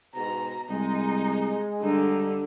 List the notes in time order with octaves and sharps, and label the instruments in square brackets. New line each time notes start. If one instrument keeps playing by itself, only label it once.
[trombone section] G#2 B2 [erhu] A#5
[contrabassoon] C2 [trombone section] G#3 [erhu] D#4
[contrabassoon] G2 [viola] D3 [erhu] D#4